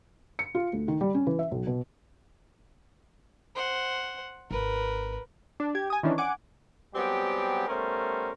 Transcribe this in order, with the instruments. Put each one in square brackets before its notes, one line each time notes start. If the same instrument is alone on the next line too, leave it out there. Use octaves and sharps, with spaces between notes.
[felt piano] C#7
F4
D2
D#3
G3
C#4
E3
E5
B1
B2
[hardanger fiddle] C5 F#5
[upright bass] G#1 [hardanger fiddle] A#4 B4
[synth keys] D4
G4 G#6
G#5 D#6
D#3 E3 C#4 D4
F#5 G#5 D6
[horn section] F#3 G3 B3 C4 G4 G#4
G3 A3 B3 C#4 A#4 C5